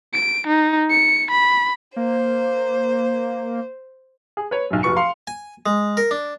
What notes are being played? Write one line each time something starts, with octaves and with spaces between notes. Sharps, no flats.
D7
D#4
C#7
B5
A#3 C5
G#4
B4 C#5
B1 F#2
F1 F#3 B4 C#6 C#7
F5 C6
G#5
G#3
A#4
D4